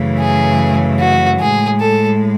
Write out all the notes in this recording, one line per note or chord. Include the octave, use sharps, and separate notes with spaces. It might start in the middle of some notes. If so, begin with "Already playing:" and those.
Already playing: F#2 C#3 E3 A3
G#4
F#4
A2 G#3 G#4
A4